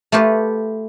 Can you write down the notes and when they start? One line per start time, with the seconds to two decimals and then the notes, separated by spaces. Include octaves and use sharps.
0.12 A3 F4 G4 B4